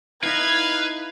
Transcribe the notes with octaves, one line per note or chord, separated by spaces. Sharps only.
D#4 E4 B4 F5 G#6